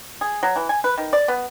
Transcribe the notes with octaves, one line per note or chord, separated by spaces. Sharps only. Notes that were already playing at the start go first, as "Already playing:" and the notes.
G#4
F#3
E3
G#5
B4
D#3
D5
B3